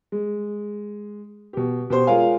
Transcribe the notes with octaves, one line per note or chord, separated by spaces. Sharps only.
G#3
B2 G4
B2 G4 C5 C6
G#3 F4 A#4 C#5 F5 G#5